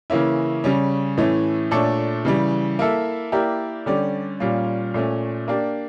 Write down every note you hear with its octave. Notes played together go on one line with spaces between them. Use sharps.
C#3 E3 A#3 C#4 E4
C#3 G3 C#4
A2 E3 A3 C#4
A#2 A3 D4 A4 C#5
C#3 E3 G3
A#3 E4 A4 E5
A#3 E4 G4 A#4 D5
D3 G3 C#4 G4 D5
A#2 G3 A#3 C#4 F4
A#2 A3 C#4
A#3 D4 G4 D5